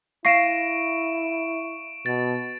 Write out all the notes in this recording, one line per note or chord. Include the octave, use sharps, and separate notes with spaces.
E4 F5 C#6 A#6 C7 D7 E7
B2 A6